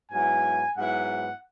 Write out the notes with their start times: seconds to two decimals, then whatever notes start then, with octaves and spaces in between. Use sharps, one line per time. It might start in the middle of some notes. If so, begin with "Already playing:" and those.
0.11 G#2 F#3 B3 E4 G#5
0.76 G#2 F#3 B3 E4 F#5